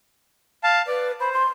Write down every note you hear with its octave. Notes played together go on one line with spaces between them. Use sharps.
F5 A5
B4 D5
C5 B5
C6